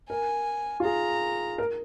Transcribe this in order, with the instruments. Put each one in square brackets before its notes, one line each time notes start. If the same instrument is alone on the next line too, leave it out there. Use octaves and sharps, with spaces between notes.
[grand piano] A#4 [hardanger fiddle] G#5
[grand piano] F4
[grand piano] G#4 [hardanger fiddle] A#5
[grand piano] A#4